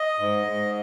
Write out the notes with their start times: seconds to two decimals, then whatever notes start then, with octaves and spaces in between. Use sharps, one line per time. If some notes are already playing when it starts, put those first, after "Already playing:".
Already playing: D#5
0.19 G#2
0.47 G#2